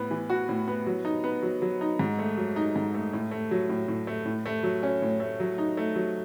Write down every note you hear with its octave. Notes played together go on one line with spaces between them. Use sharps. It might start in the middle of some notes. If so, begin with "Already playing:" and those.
Already playing: A2 B3
E3
F#4
A2
B3
F#3
D#4
B3
F#3
F#3
D#4
G#2
A3
F#3
D#4
G#2
A3
A2
A3
F#3
A2
A2
A3
A2
A3
F#3
C#4
A2
A3
F#3
D#4
A3
F#3